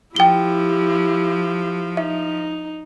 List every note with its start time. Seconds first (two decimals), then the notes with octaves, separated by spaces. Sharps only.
0.16 F3 E4 G4 G5 G7
1.97 D#4 E5